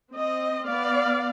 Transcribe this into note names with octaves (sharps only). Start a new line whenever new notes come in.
C4 D#5
B3 D5 F5